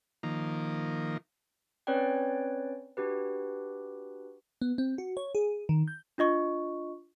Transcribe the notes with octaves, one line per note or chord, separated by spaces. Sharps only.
D#3 F3 A#3
C4 C#4 B4 C#5 D5 G5
D4 F#4 G4 B4
B3
C4
F#4
C#5
G#4
D#3
G6
D4 F4 D#5 C#6